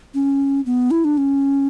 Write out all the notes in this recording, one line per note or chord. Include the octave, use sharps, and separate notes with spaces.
C#4
B3
E4
D4
C#4